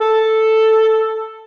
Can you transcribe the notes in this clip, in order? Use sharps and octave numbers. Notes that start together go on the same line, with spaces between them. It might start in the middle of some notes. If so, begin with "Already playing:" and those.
A4